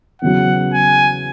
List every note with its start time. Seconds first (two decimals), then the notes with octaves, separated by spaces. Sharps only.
0.22 E2 C#3 F#3 F#5
0.74 G#5